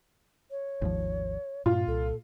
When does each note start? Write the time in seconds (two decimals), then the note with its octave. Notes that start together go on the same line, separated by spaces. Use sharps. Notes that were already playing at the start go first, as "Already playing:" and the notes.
0.51 C#5
0.82 G#1 D#2 F3
1.66 G2 A#2 F4
1.88 C2 A4